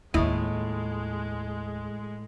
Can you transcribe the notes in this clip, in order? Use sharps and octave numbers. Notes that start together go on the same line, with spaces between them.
D#2 A2 G#3 E4 F4 D#5